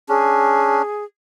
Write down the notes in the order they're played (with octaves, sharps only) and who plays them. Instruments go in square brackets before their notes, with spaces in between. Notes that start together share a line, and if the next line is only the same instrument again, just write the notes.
[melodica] C#4 D4 [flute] G#4